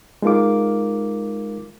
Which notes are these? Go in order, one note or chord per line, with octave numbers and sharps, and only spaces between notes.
G#3 D#4 F4 A#4 F5 D6